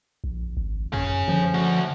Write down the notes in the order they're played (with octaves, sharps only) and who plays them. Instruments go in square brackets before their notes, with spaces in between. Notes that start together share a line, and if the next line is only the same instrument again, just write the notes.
[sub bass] A#1
G#1
[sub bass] F#2 [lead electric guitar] C#4 G#4
[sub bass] D3 [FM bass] F3
[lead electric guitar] A3 F#4